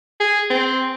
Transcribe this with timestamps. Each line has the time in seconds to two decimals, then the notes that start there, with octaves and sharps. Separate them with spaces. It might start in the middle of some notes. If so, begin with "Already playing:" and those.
0.20 G#4
0.50 C4